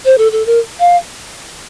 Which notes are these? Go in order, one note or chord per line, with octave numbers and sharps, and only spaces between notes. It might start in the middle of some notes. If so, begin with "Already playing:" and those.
C5
A4
A4
A#4
F5